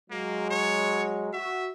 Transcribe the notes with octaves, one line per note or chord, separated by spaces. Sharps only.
F#3 G#3 A#3 F#4
C#5
F#4 E5